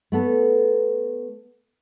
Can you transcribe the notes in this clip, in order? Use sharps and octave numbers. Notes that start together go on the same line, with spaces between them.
A3 B3 A4